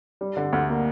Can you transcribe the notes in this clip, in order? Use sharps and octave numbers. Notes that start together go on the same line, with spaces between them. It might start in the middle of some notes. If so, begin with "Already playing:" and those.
G3
D3
D2
A#3